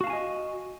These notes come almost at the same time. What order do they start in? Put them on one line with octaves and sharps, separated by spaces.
F#4 F5 A5 G#5 D#5